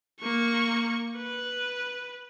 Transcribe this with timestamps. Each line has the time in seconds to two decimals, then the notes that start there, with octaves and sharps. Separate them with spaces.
0.21 A#3 C#6
1.18 B4